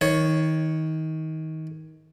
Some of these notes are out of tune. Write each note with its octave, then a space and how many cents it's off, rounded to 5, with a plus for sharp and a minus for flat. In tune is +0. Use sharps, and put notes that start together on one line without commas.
D#3 +25 C#5 +0